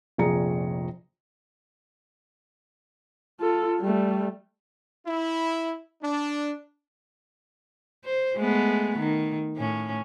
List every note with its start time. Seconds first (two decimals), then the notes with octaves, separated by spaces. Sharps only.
0.18 F1 A#1 G#4 A#5 C#7
3.40 F4 A4
3.81 G3 A3
5.07 E4
6.02 D4
8.05 C5
8.37 G#3 A3 B3
8.99 D#3
9.57 A2 C#4